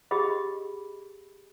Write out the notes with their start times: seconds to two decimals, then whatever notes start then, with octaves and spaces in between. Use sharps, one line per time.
0.11 G4 G#4 D#5 B5